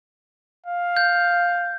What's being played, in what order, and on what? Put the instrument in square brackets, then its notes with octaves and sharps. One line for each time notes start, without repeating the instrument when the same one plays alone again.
[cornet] F5
[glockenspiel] G6